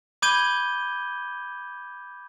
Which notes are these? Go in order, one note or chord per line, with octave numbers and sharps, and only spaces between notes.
B5 D6 G6 G#6 D#7 G7